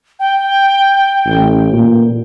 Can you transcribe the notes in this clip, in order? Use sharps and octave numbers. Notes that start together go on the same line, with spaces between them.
G5
A1
A#2